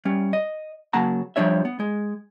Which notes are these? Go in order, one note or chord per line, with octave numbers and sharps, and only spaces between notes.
G3 C#4
D#5
C#3 F#3 A#3 F#5 A5 A#5
F3 G3 D4 C#5 E5
B3
G#3